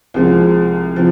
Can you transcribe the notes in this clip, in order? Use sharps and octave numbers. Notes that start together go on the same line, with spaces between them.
C2 C3 F3 G#3
C3 F3